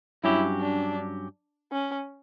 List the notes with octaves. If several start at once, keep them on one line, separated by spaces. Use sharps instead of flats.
G2 F#3 C#4 E4 G4
D4
C#4